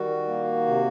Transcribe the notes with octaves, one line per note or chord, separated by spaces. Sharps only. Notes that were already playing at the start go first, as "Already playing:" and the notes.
Already playing: D#3 G3 F#4
A#3
C3